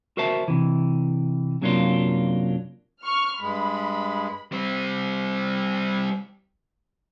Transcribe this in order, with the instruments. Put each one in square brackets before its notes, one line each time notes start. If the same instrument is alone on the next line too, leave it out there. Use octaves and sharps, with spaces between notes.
[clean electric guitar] F#4 A#4 C5 E5 A5
C3 E3
F#2 C3 F#3 A#3 D4 F4
[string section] C#6 F6
[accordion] G2 G#3 [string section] B5
[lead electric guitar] G3 C4